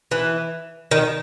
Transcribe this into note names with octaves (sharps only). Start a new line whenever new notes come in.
E3
D#3